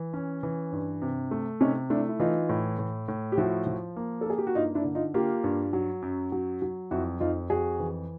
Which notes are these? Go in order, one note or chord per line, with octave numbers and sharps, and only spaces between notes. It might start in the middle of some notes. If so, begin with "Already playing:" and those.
Already playing: E3
C#4
E3
G2
C3
A3
C3 C#4 D#4
A3 D4 E4
E4
E3 D#4 F4
A2
A2
A2
G4
F3 E4 F#4
F3
A#3
A4
A#3 G#4
G4
F#4
G2 D#4 F4
D4 E4
D3
D#4 F4
A#3 F4 G4
G2
F#3
F#2
F#3
F#3
F2 E4 F#4
F2 D#4 F4
F2 F#4 G#4
E3